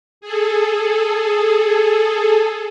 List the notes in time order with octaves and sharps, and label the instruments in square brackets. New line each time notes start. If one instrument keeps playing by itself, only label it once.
[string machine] G#4 A4